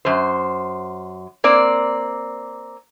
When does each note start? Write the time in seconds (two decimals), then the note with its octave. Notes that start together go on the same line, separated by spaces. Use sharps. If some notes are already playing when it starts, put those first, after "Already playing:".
0.05 F#2 C5
1.44 A#3 C4 D5